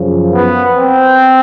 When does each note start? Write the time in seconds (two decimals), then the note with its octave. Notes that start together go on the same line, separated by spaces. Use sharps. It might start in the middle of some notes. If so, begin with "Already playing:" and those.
Already playing: F#2 C#3 F3
0.32 B3
0.76 C4